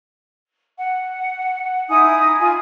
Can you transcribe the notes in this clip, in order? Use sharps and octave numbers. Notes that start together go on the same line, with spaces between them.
F#5
D#4 E4 G#5 D#6
F4 G#5